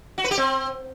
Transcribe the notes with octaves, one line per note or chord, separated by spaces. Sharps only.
F#4
B4
G4
C4